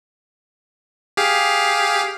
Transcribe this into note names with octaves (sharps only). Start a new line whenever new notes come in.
G4 G#4 F5